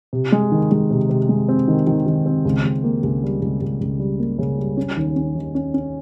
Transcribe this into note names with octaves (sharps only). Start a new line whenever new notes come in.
C3
G#3
D#3
G#3
C3
C3
G#3
C4
D#3
D#3
D#3
C4
C#2
C#2
A#3
C#2
G3
C#2
C#2
C#2
G3
A#3
C#3
G3
C#4
D#2
C#4
D#3
C#4
C#4